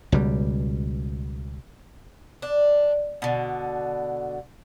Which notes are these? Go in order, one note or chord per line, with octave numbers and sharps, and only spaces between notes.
C#2 B2 G3
D4
B2 D3